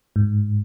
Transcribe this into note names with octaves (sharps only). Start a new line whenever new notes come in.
G#2